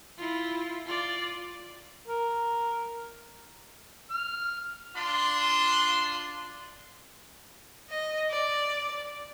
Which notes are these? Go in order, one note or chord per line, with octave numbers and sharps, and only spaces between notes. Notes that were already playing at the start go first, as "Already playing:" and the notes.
E4 F4
F4 D5
A#4
F6
D4 F4 C6
D#5
D5